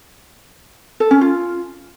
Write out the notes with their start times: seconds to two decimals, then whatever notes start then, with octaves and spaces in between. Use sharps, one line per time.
1.00 A4
1.11 C#4
1.21 F4